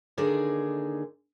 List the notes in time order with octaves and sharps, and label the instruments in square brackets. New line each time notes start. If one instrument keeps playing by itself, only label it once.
[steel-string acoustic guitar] D#2 D3 D#4 G#4 D5